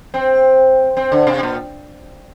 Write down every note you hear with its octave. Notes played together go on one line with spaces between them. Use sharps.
C4
C4
D3
C3
A#2